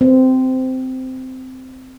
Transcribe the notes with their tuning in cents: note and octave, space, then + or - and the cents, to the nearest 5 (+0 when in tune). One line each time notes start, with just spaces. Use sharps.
C4 -15